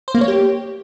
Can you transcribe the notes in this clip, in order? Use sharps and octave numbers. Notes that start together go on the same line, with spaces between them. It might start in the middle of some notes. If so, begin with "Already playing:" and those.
C5
A#3
C#5
G4